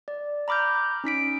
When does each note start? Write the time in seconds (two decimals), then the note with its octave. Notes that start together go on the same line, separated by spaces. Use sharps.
0.08 D5
0.48 A#5 B5 D6 F6 G6
1.04 C#4 D#4 B6 D7